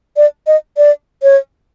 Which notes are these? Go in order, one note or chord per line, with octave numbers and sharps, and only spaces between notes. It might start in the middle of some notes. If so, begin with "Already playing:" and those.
D5
D#5
D5
C#5